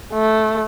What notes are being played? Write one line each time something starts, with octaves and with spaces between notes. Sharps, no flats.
A3